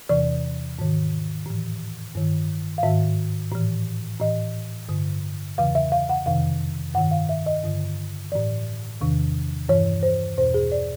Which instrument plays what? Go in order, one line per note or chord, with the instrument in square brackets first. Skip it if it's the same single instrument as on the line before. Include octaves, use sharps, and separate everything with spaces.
[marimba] E2 C3 E3 D5
G#2 D#3
A2 E3
G2 D#3
F5
G#2 D#3 E5
A2 E3
A2 E3 D#5
G2 D3
E2 C#3 E3 F5
E5
F5
F#5
F2 C3 D#3 F5
G2 D#3 F#5
F5
E5
D#5
G2 D3
A2 E3 D5
E2 C3 D#3
G2 E3 C#5
C5
E2 B2 C5
G#4
D5